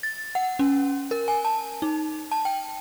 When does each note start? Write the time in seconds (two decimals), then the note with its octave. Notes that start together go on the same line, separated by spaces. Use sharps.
0.03 A6
0.35 F#5
0.59 C#4
1.11 A#4
1.28 G#5
1.45 A5
1.82 D#4
2.32 A5
2.45 G5